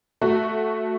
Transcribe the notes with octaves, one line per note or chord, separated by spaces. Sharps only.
A3 F#4